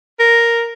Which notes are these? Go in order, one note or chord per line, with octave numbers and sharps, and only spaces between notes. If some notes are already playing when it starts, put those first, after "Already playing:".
A#4